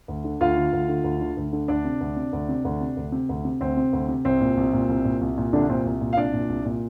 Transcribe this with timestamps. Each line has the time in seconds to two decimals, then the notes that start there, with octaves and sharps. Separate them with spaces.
0.08 D2
0.24 D3
0.41 D2 F4 F5
0.57 D3
0.73 D2
0.89 D3
1.04 D2
1.21 D3
1.37 D2
1.53 D3
1.68 D2 D4 D5
1.85 C3
2.01 D2
2.17 C3
2.33 D2
2.49 C3
2.65 D2
2.81 C3
2.97 D2
3.12 C3
3.29 D2
3.45 C3
3.61 D2 C4
3.77 C3
3.93 D2
4.09 C3
4.25 C2 C4
4.41 A#2
4.57 C2
4.73 A#2
4.89 C2
5.05 A#2
5.21 C2
5.38 A#2
5.53 C2 D3 D4
5.69 A#2 C4
5.85 C2
6.01 A#2
6.13 F5
6.17 C2 D4 D5
6.33 A#2
6.49 C2
6.65 A#2